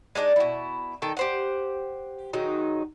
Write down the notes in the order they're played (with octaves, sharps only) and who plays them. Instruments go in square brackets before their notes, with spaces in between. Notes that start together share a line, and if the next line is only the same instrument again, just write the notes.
[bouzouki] G#3 A3 D4 D#4
B2 E4
D#3 A4 G5
G4 C5 F#5
D#3 F#3 G#3 D#4